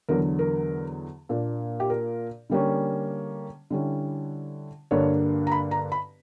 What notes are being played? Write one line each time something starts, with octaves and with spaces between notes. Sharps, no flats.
E2 D3 F#3 A#4
A#4
A#2 A#3 D4
G4
A#4
D3 G3 A#3 C#4
D3 G3 C#4 E4
G2 D3 A#3 D4 C#5
A#5
B5
A#5
B5